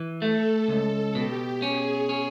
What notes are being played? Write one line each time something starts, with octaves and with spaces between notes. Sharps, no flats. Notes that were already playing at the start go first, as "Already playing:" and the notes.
Already playing: E3
A3 A4
C#2
B2 G4
C#4 G#4
C#4